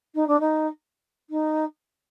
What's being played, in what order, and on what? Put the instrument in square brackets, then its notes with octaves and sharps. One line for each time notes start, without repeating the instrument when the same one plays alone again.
[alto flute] D#4
D4
D#4
D#4